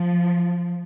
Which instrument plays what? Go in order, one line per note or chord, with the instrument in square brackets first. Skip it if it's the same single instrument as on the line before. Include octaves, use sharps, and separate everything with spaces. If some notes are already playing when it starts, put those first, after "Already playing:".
Already playing: [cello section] F3